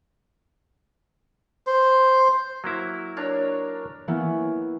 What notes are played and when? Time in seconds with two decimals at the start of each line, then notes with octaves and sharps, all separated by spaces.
1.67 C5
2.64 F#3 A#3 E4
3.16 D4 A#4 C#5
4.07 E3 A#3 B3 C#4 E4